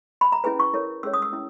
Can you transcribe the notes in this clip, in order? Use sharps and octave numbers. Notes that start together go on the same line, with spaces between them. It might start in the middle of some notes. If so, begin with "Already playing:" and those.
B5
A#5
C#4 E4 G#4 B4 G#5
C#6
E4 A#4 C#5
C#4 G#4 C#5 E6
D#6
E6
C#4 E4